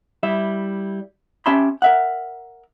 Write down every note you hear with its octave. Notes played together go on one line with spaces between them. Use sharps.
G3 E4 E5
C#4 G4 E5 A5 B5 C6
A#4 E5 F#5